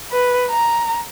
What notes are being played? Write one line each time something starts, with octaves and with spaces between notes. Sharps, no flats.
B4
A#5